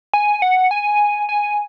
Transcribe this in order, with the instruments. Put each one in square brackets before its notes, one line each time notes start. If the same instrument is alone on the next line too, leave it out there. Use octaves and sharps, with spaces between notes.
[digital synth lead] G#5
F#5
G#5
G#5